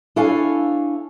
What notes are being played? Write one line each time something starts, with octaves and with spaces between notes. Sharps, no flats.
D4 E4 A4 C#5 F5 G#5